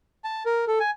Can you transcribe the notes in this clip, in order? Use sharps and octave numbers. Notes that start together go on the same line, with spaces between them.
A5
A#4
A4
G#5